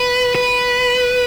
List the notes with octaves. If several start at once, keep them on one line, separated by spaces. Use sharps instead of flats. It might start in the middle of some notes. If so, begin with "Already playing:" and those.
Already playing: B4
B4